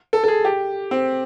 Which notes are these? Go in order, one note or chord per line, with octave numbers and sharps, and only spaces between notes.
A4
A4
G#4
G4
C4